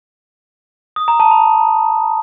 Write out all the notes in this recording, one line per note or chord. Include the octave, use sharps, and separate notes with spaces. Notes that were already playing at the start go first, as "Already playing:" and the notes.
D#6
A#5
A5
B5